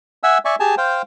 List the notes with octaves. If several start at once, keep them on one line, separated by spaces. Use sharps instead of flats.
E5 F#5 G#5 E6
D5 E5 G#5 C#6
G4 G#4 G#5 A5
C5 F5 G5